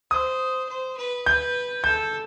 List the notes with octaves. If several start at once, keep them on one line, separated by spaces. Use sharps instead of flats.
C5 D#6
C5
B4
B4 G6
A4 G6